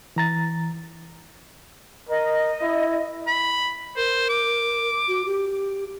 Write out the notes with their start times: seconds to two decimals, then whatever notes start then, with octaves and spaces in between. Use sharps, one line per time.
0.16 E3 A#5 A6
2.09 A#4 D#5
2.61 E4
3.27 B5
3.97 A#4 C5
4.29 D6
5.08 F#4
5.26 G4